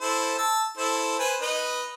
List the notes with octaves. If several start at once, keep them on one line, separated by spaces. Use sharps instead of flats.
E4 A4 C5
A5 E6
E4 A4 C5
B4 C5 G#5
D#4 B4 D#5